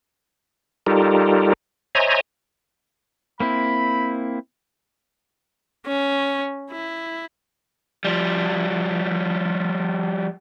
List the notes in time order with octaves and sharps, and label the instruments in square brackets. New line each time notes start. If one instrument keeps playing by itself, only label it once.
[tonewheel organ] G3 D#4 F4 G4 A4 A#4
C5 C#5 D#5 E5 G#5 A#5
[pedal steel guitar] A#3 C4 E4 [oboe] B5
[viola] C#4
E4
[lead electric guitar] F3 G3